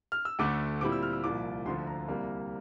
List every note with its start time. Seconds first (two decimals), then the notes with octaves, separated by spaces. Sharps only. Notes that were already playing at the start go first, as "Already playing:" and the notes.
0.12 F6
0.25 E6
0.39 D2 D3 A3 D6
0.81 A#2 G3 C4 E4 D6
0.92 E6
1.03 F6
1.13 E6
1.24 C2 A#2 F3 D6
1.66 D2 D3 F3 C6
1.87 A#5
2.08 C2 C3 G3 A#3